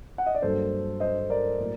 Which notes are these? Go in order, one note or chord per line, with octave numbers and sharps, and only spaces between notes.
F#5
D#5
D5
G2 F#3 A#3 D4 A4 C5
C5 D#5
A#4 D5
A2 F#3 A#3